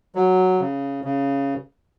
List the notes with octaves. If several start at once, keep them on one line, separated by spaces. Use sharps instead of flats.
F#3
C#3
C#3